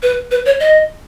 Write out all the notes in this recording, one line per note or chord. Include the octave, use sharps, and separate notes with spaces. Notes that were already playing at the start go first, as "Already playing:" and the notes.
B4
B4
C#5
D#5